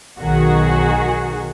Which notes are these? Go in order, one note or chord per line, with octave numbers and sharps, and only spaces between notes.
B1 D#3 F#4 G#4